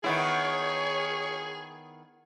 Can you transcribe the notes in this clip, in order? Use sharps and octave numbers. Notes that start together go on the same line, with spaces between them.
D#3 B3 E4 G#4 C#5